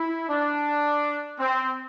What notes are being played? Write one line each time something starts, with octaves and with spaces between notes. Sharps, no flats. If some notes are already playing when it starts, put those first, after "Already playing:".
Already playing: E4
D4
C4